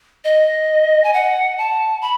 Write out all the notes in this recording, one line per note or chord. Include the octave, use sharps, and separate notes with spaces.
D#5
G#5
F#5
A5
B5